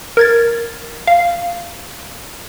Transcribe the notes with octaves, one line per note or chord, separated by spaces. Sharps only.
A#4 G#6 A6
F5